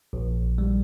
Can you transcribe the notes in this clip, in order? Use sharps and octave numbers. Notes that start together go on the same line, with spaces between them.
A#1
G3